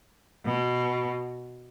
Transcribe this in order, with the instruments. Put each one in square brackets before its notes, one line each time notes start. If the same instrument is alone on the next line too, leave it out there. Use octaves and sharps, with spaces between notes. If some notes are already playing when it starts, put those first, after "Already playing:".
[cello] B2